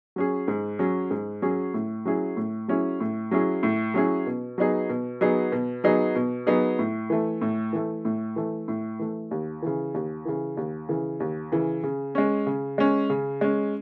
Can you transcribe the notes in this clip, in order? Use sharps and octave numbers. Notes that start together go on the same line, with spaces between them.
F#3 C#4 G#4
G#2
F#3 C#4 G#4
G#2
F#3 C#4 G#4
A2
F#3 C#4 E4 G#4
A2
F#3 C#4 E4 G#4
A2
F#3 C#4 E4 G#4
A2
F#3 C#4 E4 G#4
B2
F#3 B3 D#4 G#4
B2
F#3 B3 D#4 G#4
B2
F#3 B3 D#4 G#4
B2
F#3 B3 D#4 G#4
A2
E3 A3
A2
E3 A3
A2
E3 A3
A2
E3 A3
D#2
C#3 E3
D#2
C#3 E3
D#2
C#3 E3
D#2
C#3 E3
C#3
G#3 C#4
C#3
G#3 C#4
C#3
G#3 C#4